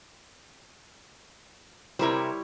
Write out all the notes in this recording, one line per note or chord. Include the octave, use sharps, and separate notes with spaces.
C3 G3 E4 A#4 C5 C#5